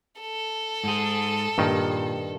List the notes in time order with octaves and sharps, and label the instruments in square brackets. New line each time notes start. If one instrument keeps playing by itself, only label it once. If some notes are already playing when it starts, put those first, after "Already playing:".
[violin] A4
[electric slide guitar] G#2 G#4
[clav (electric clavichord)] G2 D#3 [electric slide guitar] A#2